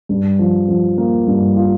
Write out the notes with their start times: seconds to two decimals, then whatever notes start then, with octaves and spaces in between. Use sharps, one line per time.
0.09 G2
0.39 F3
0.68 F3
0.98 A#3
1.27 G2
1.56 F4